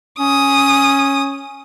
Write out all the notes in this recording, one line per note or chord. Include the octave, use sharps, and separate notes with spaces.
C#4 D#6